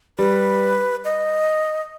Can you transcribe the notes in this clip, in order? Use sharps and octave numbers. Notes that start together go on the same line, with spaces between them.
G3 B4
D#5